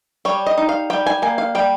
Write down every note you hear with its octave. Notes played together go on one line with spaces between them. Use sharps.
G3 C#5
D#5
D#4
F5
G3 G5
G#5
A#3 G#5
F5
G3 G5